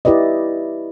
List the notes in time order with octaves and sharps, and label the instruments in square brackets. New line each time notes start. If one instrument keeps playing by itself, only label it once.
[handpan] E4 G4 B4 D5 D#5